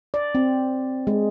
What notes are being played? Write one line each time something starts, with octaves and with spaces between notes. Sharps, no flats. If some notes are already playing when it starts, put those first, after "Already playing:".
D5
C4
G#3